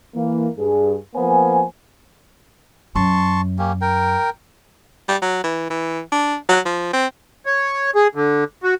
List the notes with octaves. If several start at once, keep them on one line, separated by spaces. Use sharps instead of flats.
E3 A#3
G2 G#4
F3 A#3 B3 C5 G#5
F#2 A5 C6 C#6
A#3 C#4 G4
A#4 G5
G3
F#3
E3
E3
D4
F#3
F3
C4
C#5
G#4
D3
F#4